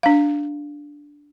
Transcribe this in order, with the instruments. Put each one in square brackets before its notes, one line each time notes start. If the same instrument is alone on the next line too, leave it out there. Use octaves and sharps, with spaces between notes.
[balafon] D4 F5